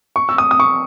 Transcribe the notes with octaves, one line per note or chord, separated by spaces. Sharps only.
C#6
E6
D#6
D#6
C#6